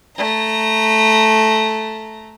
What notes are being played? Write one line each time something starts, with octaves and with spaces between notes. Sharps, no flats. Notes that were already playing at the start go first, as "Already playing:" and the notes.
A3 A#5